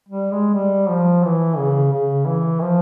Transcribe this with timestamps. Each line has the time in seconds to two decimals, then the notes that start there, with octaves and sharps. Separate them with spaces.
0.09 G3
0.32 G#3
0.54 G3
0.90 F3
1.24 E3
1.58 C#3
1.92 C#3
2.26 E3
2.61 F3